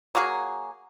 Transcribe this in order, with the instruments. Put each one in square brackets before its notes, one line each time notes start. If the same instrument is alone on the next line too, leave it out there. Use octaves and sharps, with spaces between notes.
[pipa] F#3 A#3 F#4 G#4